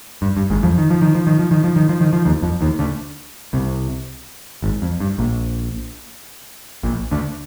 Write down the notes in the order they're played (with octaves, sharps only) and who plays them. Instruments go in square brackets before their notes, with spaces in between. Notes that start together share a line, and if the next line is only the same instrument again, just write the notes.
[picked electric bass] G2
G2
G#1 G#2
F2 F3
D#3
F3
D#3
F3
D#3
F3
D#3
F3
D#3
F3
D#3
F3
D#2 D#3
F2 F3
D#2 D#3
D2 D3
C2 C3
G#1 G#2
F2
G2
A#1 A#2
A#1 A#2
D2 D3